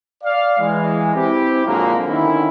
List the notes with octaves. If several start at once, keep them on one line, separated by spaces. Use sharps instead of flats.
D5 F5
E3 G#3
C4 E4 G4
A#2 D3 F3 F#3 G#3 A#3
D3 D#3 C4 C#4 E4